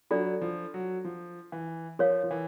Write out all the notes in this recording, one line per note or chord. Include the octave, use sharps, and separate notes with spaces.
F#3 D4 F4 A4 D5
F3
F#3
F3
E3
F3 A#4 C#5 F5
F3
E3